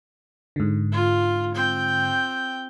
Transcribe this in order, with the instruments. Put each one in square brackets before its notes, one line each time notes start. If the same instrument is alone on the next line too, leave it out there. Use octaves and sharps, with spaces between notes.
[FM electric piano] G#2 D3
[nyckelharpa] F4
C4 G5